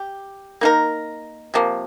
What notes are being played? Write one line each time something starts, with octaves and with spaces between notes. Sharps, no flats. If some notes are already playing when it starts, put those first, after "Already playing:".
Already playing: G4
A#3 D#4 A#4
C3 F3 A#3